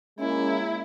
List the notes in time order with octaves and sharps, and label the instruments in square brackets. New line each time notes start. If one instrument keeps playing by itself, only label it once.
[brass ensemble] G#3 A#3 C#4 [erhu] E4